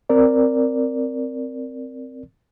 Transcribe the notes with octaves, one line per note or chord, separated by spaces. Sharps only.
C4 A#4 D5